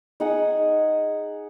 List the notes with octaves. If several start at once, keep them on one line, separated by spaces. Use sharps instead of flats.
D#4 G#4 F#5 G#5